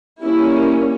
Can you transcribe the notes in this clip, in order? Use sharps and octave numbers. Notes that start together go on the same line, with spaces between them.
G3 A#3 C#4 E4